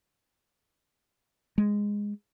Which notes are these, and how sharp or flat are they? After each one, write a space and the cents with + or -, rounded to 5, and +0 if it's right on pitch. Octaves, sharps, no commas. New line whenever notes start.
G#3 -10